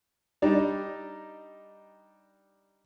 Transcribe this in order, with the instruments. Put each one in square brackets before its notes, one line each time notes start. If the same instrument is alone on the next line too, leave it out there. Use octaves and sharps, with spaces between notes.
[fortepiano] G3 D4 D#4 G4